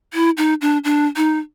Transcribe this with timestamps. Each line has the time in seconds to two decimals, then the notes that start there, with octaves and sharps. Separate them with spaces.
0.14 E4
0.38 D#4
0.61 D4
0.84 D4
1.17 D#4